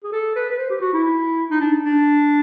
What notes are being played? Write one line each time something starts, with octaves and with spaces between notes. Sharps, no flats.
G#4
A4
B4
B4
C5
G4
F#4
E4
D#4
D4
D4